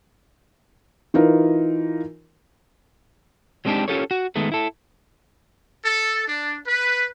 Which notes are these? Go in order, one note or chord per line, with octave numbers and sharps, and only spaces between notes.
E3 D#4 F4 A#4
F#3 G#3 C4 D4 D#4 G4
C#4 F4 G4 A4 A#4 C#5
F#4
D#3 G#3 A3 B3
E4 A4
A4
D4
B4